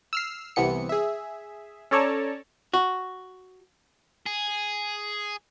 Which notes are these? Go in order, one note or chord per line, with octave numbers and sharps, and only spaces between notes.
E6 F6 C7
C2 C3 E3 B3 C#7
G#4 E5
C#4 A4 C#5 D5 A5 A#5
F#4
G#4